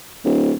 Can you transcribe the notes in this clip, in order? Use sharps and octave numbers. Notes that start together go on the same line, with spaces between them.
D1